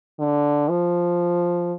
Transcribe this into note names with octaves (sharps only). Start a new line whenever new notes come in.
D3
F3